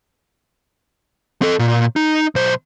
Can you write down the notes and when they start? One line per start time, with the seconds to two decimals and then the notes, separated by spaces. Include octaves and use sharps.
1.42 C4 A4
1.59 A#2
1.96 D#4
2.35 B1 C5